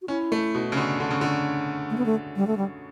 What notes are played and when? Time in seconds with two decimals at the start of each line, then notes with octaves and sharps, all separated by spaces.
0.02 F#4
0.08 C#4 E4
0.32 A3
0.54 B2
0.72 C#3
0.77 D3
1.00 D3
1.11 C#3
1.21 D3
1.90 A3
1.97 B3
2.06 A3
2.36 G3
2.47 A3
2.57 G3